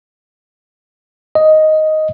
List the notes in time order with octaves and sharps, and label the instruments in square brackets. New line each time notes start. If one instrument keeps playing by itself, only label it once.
[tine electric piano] D#5